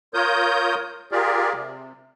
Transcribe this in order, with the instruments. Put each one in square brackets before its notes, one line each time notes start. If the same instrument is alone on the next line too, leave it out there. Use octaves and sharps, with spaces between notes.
[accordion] F4 A#4 C#5 D#6 G6
F4 G4 G#4 A#4 D5
C3